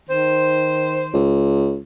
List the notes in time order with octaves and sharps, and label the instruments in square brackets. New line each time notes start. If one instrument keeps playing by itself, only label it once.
[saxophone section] D#3 C5
[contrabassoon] C#2